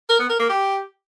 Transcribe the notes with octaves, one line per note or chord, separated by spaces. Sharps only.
A#4
B3
A#4
A#3
G4